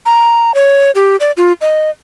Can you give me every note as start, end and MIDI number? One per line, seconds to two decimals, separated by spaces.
0.06 0.54 82
0.54 0.91 73
0.95 1.16 67
1.20 1.32 74
1.37 1.53 65
1.61 1.90 75